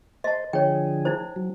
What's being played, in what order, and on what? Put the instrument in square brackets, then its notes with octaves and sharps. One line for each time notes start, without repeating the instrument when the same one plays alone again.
[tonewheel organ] C5 [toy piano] D#5 A5
[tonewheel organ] D3 F3 G#4 [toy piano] C#5 G5
[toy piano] D#4 E4 C5
[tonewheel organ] F#3